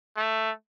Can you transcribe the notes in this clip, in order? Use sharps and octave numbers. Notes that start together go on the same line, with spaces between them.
A3